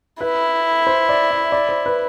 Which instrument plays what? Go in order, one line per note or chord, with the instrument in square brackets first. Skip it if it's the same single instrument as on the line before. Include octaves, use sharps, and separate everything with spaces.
[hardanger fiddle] E4 [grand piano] B4
[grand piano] C5
D5
E5
D5
C5
B4